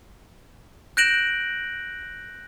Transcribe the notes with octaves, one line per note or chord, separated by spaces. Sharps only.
F#6 G6 A#6 D7 E7 F#7